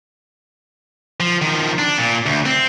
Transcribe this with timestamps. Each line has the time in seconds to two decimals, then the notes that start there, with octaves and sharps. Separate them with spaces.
1.20 F3
1.42 D#3 F3
1.79 D4
1.98 A#2
2.26 D2
2.46 C4